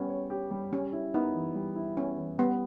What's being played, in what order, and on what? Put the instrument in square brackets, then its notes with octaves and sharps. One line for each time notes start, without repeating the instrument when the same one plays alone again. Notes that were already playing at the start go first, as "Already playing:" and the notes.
Already playing: [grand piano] G3 B3 G4 [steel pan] C#4
[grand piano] C#5
G4
G3
[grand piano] G3 [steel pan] C#4
[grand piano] E4
[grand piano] B3 [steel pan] D#4
[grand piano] E3
G3
E4
[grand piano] B3 [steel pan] C#4
[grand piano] E3
[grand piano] G3 [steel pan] B3